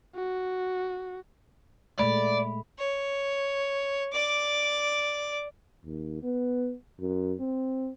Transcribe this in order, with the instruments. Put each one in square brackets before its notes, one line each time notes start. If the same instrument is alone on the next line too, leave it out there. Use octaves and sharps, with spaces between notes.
[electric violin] F#4
[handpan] A#2 G#3 A3 [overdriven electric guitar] D5 [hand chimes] B5
[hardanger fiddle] C#5
D5 D6
[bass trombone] D#2
B3
F#2
C4